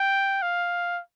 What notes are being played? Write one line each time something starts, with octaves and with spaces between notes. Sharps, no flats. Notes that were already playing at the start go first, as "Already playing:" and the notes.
Already playing: G5
F5